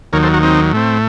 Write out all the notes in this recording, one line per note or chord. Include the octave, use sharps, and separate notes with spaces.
D#2 D#3 F#3 A#4 C#5
A4 C5
F#4 A#4
C4 D#4
A2 A3 C4